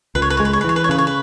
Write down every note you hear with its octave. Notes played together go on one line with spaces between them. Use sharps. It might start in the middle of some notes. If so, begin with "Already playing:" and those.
C#2 B4
C#5
B4
C#5
G#3
B4
C#5
B4
E3 C#5
B4
C#5
C#3 B4
C#5
B4